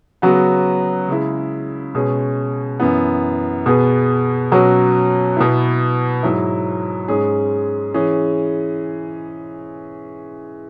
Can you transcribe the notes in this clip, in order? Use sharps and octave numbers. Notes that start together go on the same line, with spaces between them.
C#3 F#3 B3 F#4
C#3 G#3 E4
B2 G#3 C#4 G#4
F#2 E3 B3
B2 B3 G#4
B2 F#3 C#4 F#4
B2 B3 E4
G#2 F#3 E4
G#2 G#3 C#4 G#4
E3 C#4 G#4